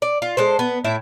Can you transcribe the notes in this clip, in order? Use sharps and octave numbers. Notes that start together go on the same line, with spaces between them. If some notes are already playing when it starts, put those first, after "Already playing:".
D5
F4
G#3 A4 C5
B3
A2 E4 E5